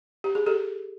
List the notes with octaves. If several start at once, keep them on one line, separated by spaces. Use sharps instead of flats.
G4
G#4
G4 A4